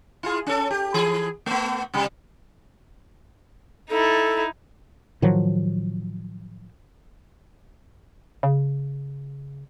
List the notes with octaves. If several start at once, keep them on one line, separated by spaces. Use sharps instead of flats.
E4 F4 G#4
C#4 A4
G4
E3 G#4
A3 B3
C3 G3
D#4 E4 A4
A2 D#3 F3 F#3
C#3